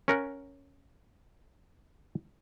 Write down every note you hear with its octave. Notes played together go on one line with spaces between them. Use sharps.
C#4 A#4 F#5